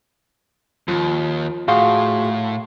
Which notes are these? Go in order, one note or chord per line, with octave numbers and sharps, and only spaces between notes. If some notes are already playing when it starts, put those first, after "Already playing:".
D#2 F3
A2 F#4 G#4 F5 C6